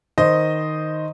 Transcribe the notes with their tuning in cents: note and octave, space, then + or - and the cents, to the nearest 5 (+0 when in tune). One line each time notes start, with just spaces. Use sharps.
D#3 +0 C5 -10 D#5 +0